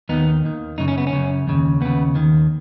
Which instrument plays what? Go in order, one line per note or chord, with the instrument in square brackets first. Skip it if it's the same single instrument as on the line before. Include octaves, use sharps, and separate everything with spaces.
[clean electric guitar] D#2 D#3 B3 D#4
D#2 D#3
F#2 C#3 D#4
C#4
B3
C#4
F#2 C#3
D#2 C#3
D#2 C#3 B3
D#2 D#3